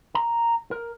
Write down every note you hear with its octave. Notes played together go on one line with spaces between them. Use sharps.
A#5
A#4